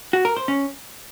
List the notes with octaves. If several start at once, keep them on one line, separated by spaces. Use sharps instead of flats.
F#4
A#4
C5
C#4